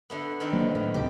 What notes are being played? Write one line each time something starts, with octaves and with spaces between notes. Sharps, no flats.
D3 A3 B3
D#3 B3 C4
F#3 A#3
A2 D#3
D1 C#2 C3 G4